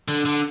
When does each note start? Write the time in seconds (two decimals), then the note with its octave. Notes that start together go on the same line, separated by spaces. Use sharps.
0.08 D3
0.25 D3